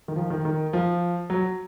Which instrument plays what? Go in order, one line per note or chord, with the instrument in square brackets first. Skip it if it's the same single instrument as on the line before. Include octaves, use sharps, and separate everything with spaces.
[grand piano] D#3
F3
D#3
D#3
F3
F#3